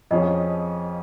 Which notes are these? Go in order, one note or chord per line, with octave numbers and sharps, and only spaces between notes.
F2 F3 C#4 G#4 D#5